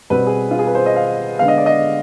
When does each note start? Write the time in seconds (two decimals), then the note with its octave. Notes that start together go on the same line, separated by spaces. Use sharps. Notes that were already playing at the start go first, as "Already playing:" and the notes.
0.10 B2 G3 C4 B4
0.26 G#4
0.51 F4
0.59 G#4
0.67 B4
0.75 C5
0.86 D#5
0.96 F5
1.39 D3 G#3 B3 F5
1.48 D#5
1.57 D5
1.66 D#5